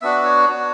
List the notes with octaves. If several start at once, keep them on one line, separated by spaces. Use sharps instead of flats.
B3 D4 F#4 E5
C#5
B3 D4 F#4